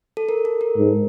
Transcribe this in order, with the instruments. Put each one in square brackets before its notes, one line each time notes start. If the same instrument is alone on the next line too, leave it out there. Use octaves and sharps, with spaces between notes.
[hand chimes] A4
A#4
A4
A#4
[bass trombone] G#2